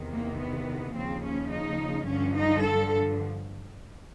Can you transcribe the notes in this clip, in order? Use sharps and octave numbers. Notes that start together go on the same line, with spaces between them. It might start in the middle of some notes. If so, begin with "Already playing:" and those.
Already playing: E2 C3 D#3
A#3
B3
D#2 C#3 F3 C4
C#4
D#4
G2 D3 F3 C#4
D#4
A4